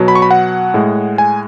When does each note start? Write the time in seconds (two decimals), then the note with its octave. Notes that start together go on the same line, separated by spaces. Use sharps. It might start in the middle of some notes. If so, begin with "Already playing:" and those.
Already playing: B2 F#3
0.08 B5
0.15 C#6
0.22 B5
0.31 F#5
0.74 A2 G#3
1.18 G#5